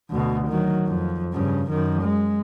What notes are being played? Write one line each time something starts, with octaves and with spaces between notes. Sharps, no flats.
D2 B2
D#3 F#3
F2
G2 C#3
F#2 D#3
G#3